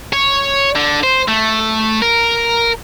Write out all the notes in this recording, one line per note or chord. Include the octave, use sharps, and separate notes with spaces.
C#5
D3
C5
A3
A#4